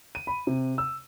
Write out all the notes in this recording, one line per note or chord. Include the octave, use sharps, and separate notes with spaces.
D#7
B5
C3
E6